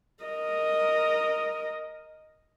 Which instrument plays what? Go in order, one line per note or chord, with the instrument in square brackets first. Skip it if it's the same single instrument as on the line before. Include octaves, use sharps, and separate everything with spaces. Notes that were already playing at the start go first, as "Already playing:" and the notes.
[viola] A#4 D#5